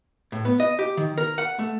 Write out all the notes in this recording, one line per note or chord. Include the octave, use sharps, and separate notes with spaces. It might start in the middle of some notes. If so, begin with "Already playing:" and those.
A2
B3
D#5
G4
D#3
A#4
F#5
A3